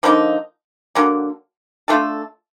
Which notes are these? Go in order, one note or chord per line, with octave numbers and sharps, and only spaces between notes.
D3 F3 A#3 D#4
D3 F#3 A#3
A3 D4 F4 A4